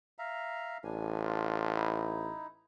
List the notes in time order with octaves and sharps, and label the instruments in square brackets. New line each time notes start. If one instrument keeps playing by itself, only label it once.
[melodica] E5 F5 A#5
[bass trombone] A1 [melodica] G3 D4 G#5
[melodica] D4 F4
D#4 E4